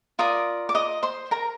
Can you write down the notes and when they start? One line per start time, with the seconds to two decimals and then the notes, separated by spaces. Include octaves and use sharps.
0.19 F4 A#4 D5 D#6
0.69 D6
0.75 D#5 D#6
1.03 C5 C6
1.31 A#4 A#5